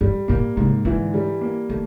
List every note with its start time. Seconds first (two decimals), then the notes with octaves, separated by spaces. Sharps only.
0.01 G2 G3
0.28 A#2 A#3
0.56 G#2 C#3
0.85 D3 E3
1.14 G3
1.41 A#3
1.69 D#3 A3